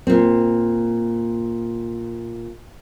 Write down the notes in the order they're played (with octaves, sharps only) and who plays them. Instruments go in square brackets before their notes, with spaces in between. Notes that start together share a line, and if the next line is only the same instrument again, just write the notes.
[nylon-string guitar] A#2 C4